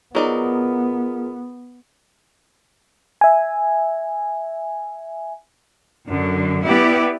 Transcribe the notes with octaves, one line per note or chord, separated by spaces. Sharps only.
F#3 B3 D#4 F4 G#4 A#4 D5
E5 G#5
F#2 D3
B3 E4 G4 D5